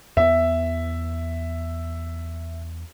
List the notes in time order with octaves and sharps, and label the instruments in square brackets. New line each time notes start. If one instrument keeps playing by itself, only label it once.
[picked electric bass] E2 B3 [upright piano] E5